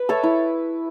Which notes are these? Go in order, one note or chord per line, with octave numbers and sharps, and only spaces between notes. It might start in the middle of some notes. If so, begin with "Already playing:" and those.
Already playing: B4
A4 C#5 E5
E4